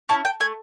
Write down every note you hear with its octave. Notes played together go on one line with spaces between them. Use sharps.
C#4 E4 A5
G5
A3 G#5